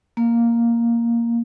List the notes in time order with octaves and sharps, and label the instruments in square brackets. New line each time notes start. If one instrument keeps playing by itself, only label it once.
[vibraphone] A#3